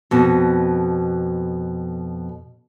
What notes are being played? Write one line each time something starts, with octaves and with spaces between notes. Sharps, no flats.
F2 B2